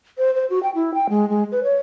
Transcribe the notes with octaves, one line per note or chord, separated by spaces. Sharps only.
C5
C5
F#4
G5
E4
G5
G#3
G#3
B4
C#5